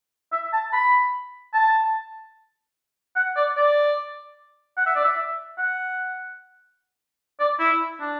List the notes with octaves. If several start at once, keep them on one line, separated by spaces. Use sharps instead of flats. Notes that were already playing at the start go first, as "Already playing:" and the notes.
E5
A5
B5
A5
F#5
D5
D5
F#5
E5
D5
E5
F#5
D5
E4
D4